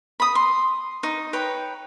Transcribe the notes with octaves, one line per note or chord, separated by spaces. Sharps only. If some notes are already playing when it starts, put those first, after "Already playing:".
B5 D#6
C6
D#4 C#6
B4 C#5 G5